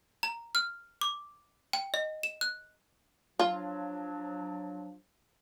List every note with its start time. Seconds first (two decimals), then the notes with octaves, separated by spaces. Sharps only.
0.23 A#5
0.55 F6
1.01 D6
1.73 G5
1.94 D#5
2.23 E7
2.41 F#6
3.39 F3 F#3 D4 F4